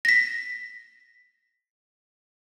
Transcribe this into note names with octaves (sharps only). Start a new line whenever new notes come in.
A#6 B6